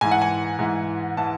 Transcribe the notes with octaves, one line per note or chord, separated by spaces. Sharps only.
G#2 E3 G#5
F#5
G#5
G#2 E3
E3 A5